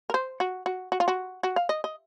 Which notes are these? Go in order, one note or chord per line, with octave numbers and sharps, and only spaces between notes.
A#4
C5
F#4
F#4
F#4
F4
F#4
F#4
F5
D#5
D#5